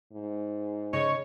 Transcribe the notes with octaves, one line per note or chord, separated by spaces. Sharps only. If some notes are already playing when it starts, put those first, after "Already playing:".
G#2
C#3 C#5 D#5